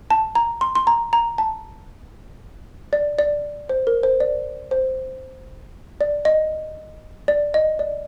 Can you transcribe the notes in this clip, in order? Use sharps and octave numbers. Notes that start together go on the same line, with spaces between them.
A5
A#5
C6
C6
A#5
A#5
A5
D5
D5
C5
A#4
C5
D5
C5
D5
D#5
D5
D#5
D5